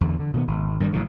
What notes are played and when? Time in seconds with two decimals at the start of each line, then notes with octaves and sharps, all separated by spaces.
0.01 E2 D3
0.19 D3
0.34 B2 D#3 B3
0.47 G#1
0.80 G2 D#3 F3 G3
0.92 A1 A2 C#3 F#3